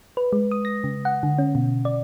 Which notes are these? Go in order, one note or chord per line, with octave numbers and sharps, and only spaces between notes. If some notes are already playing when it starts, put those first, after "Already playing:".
B4
G#3
D#6
A#6
C#3
F#5
D3
C#4
B2
D5